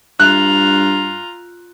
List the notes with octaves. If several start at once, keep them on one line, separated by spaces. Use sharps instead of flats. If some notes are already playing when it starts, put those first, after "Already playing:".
G2 F4 A#5 F#6